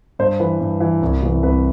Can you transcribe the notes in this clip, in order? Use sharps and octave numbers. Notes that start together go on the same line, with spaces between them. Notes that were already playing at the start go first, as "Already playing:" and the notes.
G2 C5
E3 B4
G2
E3
C2
C3 E3
C2 B4